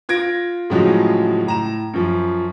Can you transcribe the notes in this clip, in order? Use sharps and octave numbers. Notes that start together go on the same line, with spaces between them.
F4 G#6 A#6 D7
A2 C#3 F3 F#3 G#3
A2 A#5 E7
F#2 F3